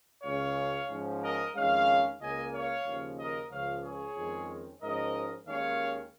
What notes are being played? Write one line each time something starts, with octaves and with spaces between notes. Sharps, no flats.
C#2 C#3 G#3 C#4 C#5 F5
G#2 F3 C#4
A#4 D#5
F2 D#3 G#3 C#4 C#5 F5
C#2 C#3 A#3 C#4 D#5 G#5
C#5 F5
D#2 C#3 F3 C#4
A#4 D#5
C#2 C#3 F3 C#5 F5
G#4 C#5
F2 D#3 G#3 C#4
G#2 F3 C#4 A#4 D#5
D#2 D#3 G#3 C#4 C#5 F5